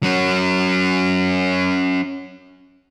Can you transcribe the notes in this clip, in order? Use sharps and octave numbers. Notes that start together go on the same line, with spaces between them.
F#3 C#4